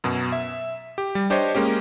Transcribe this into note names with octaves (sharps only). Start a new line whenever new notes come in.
F#2 B2
E5
G4
G3
D4 G4 C5 C#5 D#5
G#3 A#3 C#4 G4